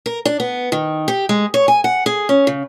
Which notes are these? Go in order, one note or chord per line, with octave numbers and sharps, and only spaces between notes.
A#4
D4
B3
D#3
G4
G#3
C#5
G#5
F#5
G#4
C#4
C#3